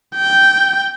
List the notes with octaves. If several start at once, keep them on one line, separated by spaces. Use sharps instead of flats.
G5